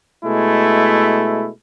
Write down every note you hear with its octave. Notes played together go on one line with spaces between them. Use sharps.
B2 G#3 A3 E4